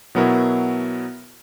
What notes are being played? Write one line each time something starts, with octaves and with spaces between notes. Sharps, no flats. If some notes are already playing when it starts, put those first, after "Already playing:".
B2 F#3 B3 E4 A#4